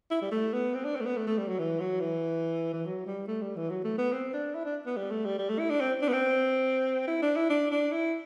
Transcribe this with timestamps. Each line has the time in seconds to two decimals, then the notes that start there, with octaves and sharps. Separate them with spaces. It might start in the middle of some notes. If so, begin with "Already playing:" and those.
0.10 E4
0.22 G3
0.31 A3
0.53 B3
0.74 C4
0.85 D4
0.96 C4
1.00 A3
1.06 B3
1.17 A3
1.27 A3
1.37 G3
1.48 F#3
1.59 E3
1.80 F#3
2.00 E3
2.73 E3
2.85 F#3
3.06 G3
3.27 A3
3.41 G3
3.56 E3
3.69 F#3
3.84 A3
3.98 B3
4.12 C4
4.33 D4
4.54 E4
4.65 D4
4.86 B3
4.96 G3
5.10 A3
5.25 G3
5.39 G3
5.49 A3
5.59 E4
5.70 D4
5.80 C4
6.02 D4
6.08 B3
6.13 C4
7.07 E4
7.22 D4
7.36 E4
7.50 D4
7.71 D4
7.92 E4